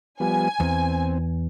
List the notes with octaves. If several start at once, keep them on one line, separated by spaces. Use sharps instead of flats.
F3 G3 B3 G#5
E2 C4